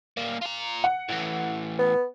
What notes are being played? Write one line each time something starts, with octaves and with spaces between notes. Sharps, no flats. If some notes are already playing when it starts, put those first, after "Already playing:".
G3 A#3
F4 A#5
F#5
A2 E3
B3